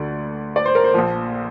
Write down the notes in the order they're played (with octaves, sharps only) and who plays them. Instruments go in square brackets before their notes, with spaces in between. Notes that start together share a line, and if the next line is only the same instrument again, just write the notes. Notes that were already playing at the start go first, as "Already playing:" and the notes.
Already playing: [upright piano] D2 D3 D5
D5
C5
A#4
C5
A#1 A#2 F3